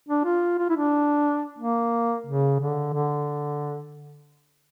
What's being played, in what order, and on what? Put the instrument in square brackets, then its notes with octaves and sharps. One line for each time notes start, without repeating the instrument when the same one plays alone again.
[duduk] D4
F4
F4
E4
D4
A#3
C#3
D3
D3